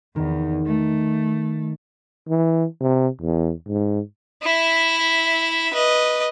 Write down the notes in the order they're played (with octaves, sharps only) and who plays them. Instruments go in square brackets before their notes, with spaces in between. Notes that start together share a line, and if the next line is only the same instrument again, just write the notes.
[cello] E2 [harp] D#3
[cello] A3
[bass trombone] E3
C3
E2
G#2
[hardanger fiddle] E4 E5
B4 D#5